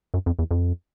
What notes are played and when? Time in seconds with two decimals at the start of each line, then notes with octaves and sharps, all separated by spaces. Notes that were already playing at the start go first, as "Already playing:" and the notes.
0.14 F#2
0.26 F2
0.39 E2
0.51 F2